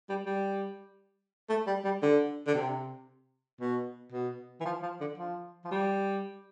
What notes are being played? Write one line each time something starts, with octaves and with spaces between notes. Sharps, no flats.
G3
G3
A3
G3
G3
D3
D3
C3
B2
B2
E3
F3
F3
D3
F3
F3
G3